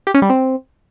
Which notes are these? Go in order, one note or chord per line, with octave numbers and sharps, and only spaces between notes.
G4
C#4
G3
C4